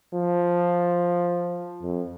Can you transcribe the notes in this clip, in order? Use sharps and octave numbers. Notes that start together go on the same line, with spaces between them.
F3
F2